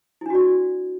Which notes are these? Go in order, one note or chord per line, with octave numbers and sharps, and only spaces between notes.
D4 E4 F#4 D5